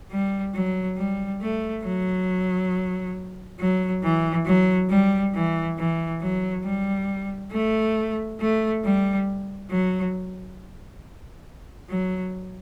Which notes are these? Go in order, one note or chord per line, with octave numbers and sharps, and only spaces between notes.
G3
F#3
G3
A3
F#3
F#3
E3
F#3
G3
E3
E3
F#3
G3
A3
A3
G3
F#3
F#3